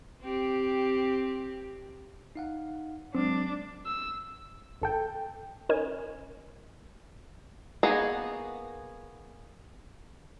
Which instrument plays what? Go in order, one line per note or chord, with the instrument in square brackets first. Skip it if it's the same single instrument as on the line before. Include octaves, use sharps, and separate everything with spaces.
[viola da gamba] C4 G4
[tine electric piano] D#4 F5 F#5
[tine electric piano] F#3 G#3 [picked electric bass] C4 [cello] D4
[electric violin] E6
[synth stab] G#1 A4 G5
[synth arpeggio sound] C#4 D#4 A#4 G#5
[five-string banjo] A#3 B3 D#4 F#4 G#4